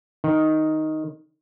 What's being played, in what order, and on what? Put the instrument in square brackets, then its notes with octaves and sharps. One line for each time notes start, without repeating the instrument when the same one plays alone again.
[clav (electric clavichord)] D#3